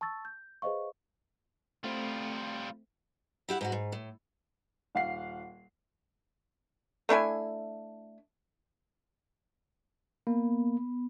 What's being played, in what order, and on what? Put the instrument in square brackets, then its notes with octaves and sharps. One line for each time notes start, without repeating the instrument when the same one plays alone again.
[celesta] A5 C#6 E6 A6
G6
G#4 B4 C5 D#5 F5 C#6
[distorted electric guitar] G3 F4 [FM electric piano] A3 C4
[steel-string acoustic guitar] E4 G4 F5 F#5
G#2 G#3 F#4
G#2
A2
[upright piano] D#1 F5 F#5 C7
[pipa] A3 D4 E4 G#5
[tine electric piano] A#3 [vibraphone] B3